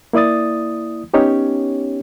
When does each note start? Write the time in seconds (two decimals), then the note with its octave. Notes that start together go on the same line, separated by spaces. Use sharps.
0.13 A#3 E4 D5 D#6 A6
1.14 B3 C#4 D#4 G4 C#5